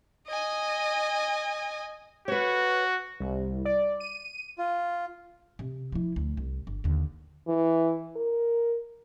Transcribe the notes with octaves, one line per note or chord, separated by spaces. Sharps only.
D#5 G#5
F#4 B4 C#5
C2
D5
D#7
F4
C3
F3 E4
D2
C2
G1
D#2 D3
E3
A#4